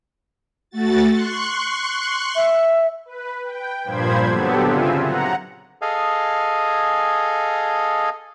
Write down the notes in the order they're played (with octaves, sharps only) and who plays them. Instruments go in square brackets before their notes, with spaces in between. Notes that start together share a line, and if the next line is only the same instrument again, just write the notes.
[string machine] A3 F#4 A6
C6 C#6 F#6
[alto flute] E5
[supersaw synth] B4
G5
G2 A#2 F3 C5 B5 G#6
D3 F#3 B3 G4 A4
C#3 C4 F4 E5 G#5
F#5 A#5
[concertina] G#4 A4 D#5 F5 G#5